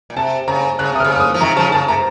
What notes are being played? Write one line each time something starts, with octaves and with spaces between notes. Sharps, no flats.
A#2
C3 A5
C#3 A#5
C#3 F#6
C3 D#6
C#3 F6
F6
D#6
F3
C3 D#3 A#5
C#3 F3 A5
C#3 A5
C3 A#5